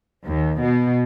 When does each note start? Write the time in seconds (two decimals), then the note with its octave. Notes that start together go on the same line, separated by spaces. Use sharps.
0.25 D#2
0.60 B2